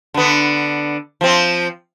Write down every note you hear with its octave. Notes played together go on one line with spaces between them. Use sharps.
D3 B3
F3 C4